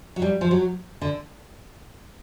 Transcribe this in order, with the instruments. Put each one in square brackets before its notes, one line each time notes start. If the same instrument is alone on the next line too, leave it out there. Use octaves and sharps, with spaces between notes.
[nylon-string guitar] F#3
G3
F3
F#3
D3